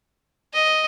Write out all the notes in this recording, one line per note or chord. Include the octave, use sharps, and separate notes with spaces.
D#5